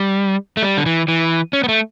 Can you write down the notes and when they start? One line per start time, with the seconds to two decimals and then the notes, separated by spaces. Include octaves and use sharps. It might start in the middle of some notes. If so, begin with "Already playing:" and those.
Already playing: G3
0.57 A3
0.63 G3
0.77 D3
0.86 E3
1.08 E3
1.53 C#4
1.64 B3
1.69 A3